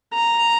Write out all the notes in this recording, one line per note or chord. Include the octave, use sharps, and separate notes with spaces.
A#5